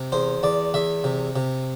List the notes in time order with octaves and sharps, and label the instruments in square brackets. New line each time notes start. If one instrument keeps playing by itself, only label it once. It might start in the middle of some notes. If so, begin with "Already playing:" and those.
Already playing: [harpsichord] C3
E2 C5
E2 D5
E2 E5
C3
C3